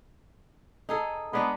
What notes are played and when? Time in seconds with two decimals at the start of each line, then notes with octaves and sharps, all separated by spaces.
0.89 D#4 G#4 A4
1.33 G#3 B3 D4 D#4